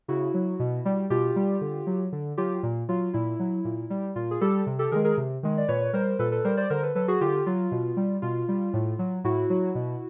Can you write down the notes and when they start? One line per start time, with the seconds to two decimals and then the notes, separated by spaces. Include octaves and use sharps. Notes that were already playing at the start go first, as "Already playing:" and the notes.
0.08 C#3 E4 F#4
0.34 F#3
0.60 B2
0.85 G3
1.10 B2 F4 G4
1.36 G3
1.61 D3
1.87 F#3
2.12 D3
2.37 F#3 F4 G4
2.63 A#2
2.89 F#3 F4
3.13 A#2 E4
3.40 F#3
3.65 A#2
3.90 G3
4.16 A#2 F4
4.31 G#4
4.41 G3 G4 A4
4.67 C3
4.79 G4 A4
4.92 D#3 G#3 G#4 A#4
5.04 G#4 A#4
5.17 C3
5.43 D#3 G#3
5.58 D5
5.68 A#2 B4 C#5
5.93 G3 A#4 C5
6.19 A#2 A4 B4
6.32 A4 B4
6.44 G3 A#4 C5
6.57 C5 D5
6.70 D3 A#4 C5
6.83 A4 B4
6.95 F#3 A4 B4
7.08 F#4 G#4
7.21 D3 F4 G4
7.46 F#3 F4
7.72 B2
7.97 G3
8.22 B2 F4
8.48 G3
8.73 A2
8.99 F#3
9.24 A2 E4 F#4
9.50 F#3
9.75 B2